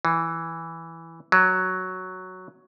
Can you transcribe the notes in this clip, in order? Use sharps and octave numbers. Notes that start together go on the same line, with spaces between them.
E3
F#3